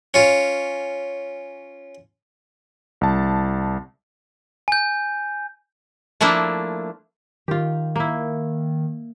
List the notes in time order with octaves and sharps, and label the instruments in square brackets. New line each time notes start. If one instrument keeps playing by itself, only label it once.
[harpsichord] C#4 F4
[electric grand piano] C2 A5
[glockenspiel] G#5 G6
[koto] F3 A3 A#3 D4 E4
[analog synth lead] D#3 [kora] F4 G4
[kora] A#3 E4